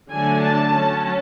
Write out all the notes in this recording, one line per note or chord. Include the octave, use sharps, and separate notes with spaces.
D3 F#3 A3 D4 G#5
A5
F#3 C#4